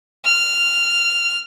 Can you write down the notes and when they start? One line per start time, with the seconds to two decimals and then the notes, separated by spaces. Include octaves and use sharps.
0.25 F6